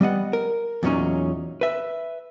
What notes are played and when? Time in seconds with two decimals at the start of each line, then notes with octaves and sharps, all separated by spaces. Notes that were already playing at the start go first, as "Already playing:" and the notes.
0.01 G3 B3 D#5 F#5
0.33 A#4
0.83 E2 A#2 F#3 C4 C#4 D#4
1.61 B4 E5